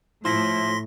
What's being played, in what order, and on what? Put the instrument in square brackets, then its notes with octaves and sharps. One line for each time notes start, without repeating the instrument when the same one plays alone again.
[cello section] A2 [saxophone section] F3 E4 [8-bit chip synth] C6 A#6 B6